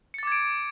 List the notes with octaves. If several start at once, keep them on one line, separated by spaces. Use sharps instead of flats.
D6 G#6 A6 C#7 D7